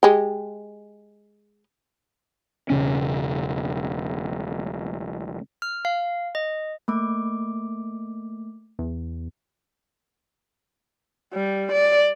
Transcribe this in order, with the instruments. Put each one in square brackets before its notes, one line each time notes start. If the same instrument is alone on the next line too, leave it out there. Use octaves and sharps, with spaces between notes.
[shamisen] G#3 G4
[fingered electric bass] E1 C#3 C#4
[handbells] F6
F5
D#5
[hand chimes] A3 A#3 D6
[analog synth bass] E2
[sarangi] G3
D5